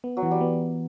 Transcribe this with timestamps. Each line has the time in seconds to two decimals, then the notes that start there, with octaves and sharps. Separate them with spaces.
0.04 B3
0.17 F#3
0.23 E3
0.31 G3
0.41 B3